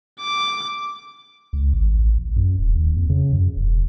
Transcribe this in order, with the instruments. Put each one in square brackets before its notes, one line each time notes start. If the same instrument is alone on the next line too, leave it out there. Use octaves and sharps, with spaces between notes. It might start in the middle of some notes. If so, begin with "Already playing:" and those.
[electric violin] D6
[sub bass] C#2
G#1
A1
A#1
F#2
D#1
D#2
F2
C#3
F#2
E1